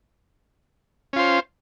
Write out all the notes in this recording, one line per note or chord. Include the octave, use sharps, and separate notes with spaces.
C#4 F4 C5